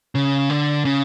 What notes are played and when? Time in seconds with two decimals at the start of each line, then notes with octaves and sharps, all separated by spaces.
0.15 C#3
0.50 D3
0.85 C#3